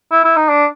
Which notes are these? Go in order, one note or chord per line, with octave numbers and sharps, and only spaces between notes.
E4
E4
D#4
D4